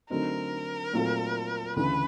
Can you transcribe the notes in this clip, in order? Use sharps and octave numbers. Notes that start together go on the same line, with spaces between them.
D3 F#3 A3 C4 D#4 A#4
A#2 F#3 A3 C4 F4
D2 C#3 E3 B4